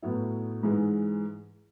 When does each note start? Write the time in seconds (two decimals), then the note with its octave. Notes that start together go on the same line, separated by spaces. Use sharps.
0.02 A2 F#3 B3 E4
0.63 G#2 E3 G#3